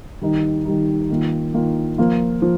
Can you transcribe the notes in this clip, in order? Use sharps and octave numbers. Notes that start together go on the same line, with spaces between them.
D#3 G3 D#4
D#3 G3 D#4
D#3 A#3 F4
D#3 A#3 F4
F3 A#3 F4
F3